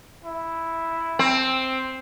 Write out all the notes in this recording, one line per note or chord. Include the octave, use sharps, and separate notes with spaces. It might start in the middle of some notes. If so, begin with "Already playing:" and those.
E4
C4